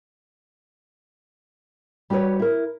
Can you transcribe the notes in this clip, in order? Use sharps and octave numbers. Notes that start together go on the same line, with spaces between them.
G3 F#4 G4 B4 C#5
E4 A#4